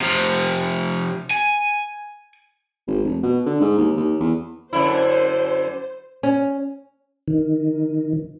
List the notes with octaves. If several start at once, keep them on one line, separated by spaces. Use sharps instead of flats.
C3 F3
G#5
G#1
F1
B2
D3
G#2
D#2
D#2
E2
F#2 D3 E4 C5
C#4
D#3